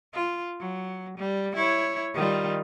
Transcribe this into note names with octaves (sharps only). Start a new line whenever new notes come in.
F4
F#3
G3
E4 C#5
D#3 G3 F4